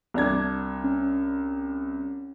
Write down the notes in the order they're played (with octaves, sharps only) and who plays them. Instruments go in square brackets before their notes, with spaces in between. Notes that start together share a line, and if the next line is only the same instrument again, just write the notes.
[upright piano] C2 D4 G#6
[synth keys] C#4